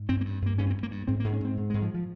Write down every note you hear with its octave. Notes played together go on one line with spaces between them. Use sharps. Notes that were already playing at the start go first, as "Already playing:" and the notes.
Already playing: G#2
G2 C4
A#3
G2
G2 A#3
G2 C#4
C4
G2
A#3
G2
G#2 C4
A#3
G#2
C#4
G#2 C4
G#2
G#3
G#2
F3
F3